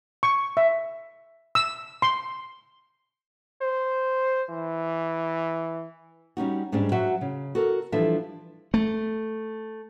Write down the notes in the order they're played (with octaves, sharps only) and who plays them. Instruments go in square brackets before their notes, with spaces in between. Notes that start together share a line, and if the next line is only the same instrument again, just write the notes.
[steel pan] C#6
E5
E6
C6
[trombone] C5
E3
[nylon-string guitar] G3 C#4 D#4 F#4
G#2 G3 G#3 C#4 D4
F#3 F#4 C5 E5
C#3
F#4 A4 A#4
E3 F3 G3 D4 A4 E5
[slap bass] A3